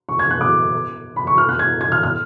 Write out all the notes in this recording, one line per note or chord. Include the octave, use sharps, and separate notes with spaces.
C#6
G#6
F#6
D6
B5
C#6
F6
F#6
G#6
G#6
F6
F6